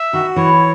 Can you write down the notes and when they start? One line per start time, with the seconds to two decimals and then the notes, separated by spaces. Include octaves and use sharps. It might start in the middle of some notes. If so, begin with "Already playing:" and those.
Already playing: E5
0.13 D#3 F#4
0.36 E3 C#5